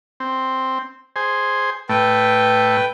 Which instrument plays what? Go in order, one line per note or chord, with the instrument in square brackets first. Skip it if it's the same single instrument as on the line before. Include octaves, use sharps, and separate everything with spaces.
[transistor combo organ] C4
G#4 C5
[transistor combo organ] A2 A3 [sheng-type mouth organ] B4 G5